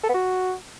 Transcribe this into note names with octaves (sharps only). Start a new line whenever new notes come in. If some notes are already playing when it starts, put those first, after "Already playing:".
A4
B3
F#4